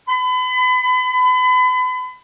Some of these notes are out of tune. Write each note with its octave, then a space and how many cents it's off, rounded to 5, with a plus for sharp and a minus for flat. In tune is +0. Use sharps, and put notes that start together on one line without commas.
B5 +35